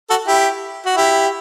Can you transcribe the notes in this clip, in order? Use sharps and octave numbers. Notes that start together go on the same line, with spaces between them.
F#4 A4
E4 G4
F#4
E4 G4